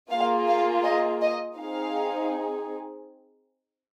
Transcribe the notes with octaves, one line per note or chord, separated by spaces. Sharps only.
A#3 F4 G#4 F5
F5
D#5
D#5
C4 D#4 G#4 F5